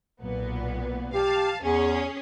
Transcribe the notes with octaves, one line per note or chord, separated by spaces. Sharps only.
B1 A#2 B3
G4 F5 A5
E2 C#4 G#4